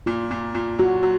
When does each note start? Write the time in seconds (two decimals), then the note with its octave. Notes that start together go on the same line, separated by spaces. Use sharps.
0.06 A#2 F4
0.31 A#2
0.55 A#2
0.79 F#3 F#4
1.03 F#3